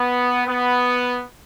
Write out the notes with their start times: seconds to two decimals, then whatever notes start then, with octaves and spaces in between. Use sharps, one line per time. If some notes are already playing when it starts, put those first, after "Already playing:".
Already playing: B3
0.47 B3